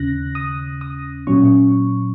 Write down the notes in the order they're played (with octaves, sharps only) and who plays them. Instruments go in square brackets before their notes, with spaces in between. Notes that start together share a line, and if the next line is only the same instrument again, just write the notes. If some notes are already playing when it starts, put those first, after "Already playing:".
Already playing: [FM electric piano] D#2 C#3 C#4 F#6 A#6
D#6
D#6
A#2 F#3 C#4 C#6